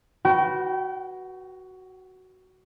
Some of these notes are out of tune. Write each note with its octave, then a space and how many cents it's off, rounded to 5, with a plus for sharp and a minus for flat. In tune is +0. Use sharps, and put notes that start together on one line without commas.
F#4 +10 B4 -15 G5 -30